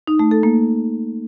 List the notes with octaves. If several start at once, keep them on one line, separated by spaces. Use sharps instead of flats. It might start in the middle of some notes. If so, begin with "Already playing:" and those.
D#4
A3
A4
A#3